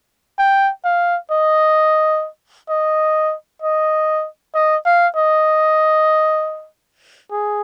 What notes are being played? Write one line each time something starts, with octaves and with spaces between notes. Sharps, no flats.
G5
F5
D#5
D#5
D#5
D#5
F5
D#5
G#4